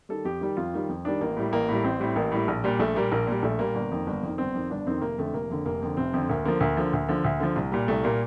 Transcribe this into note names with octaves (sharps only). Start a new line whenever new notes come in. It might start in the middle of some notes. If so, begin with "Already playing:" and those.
D#3 G3 A4
F2 G4
D#3 G3
F2 F4
D#3 G3
F2
D#3 G3 D4
A1 A#3
A2 G3
A1 A#3
A2 G3
A1 C4
A2 G3
A1 A#3
A2 G3
A#1
A#2 G3
A#1 A3
A#2 G3 A#3
A#1 A#3
A#2 G3
A#1 A3
A#2 G3 A#3
G1
F2 D#3
G1
F2 D#3
G1 C4
F2 D#3
G1 D4
F2 D#3 C4
F1 A#3
F2 D3 A3
F1 A#3
F2 D3
F1 A#3
F2 D3
F1 C4
F2 D3
D2 A#3
D3 F3 A#3
D2 A#3
D3 F3
D2
D3 F3
D2
D3 F3
C2
A#2 G3
C2 A3
A#2 G3 A#3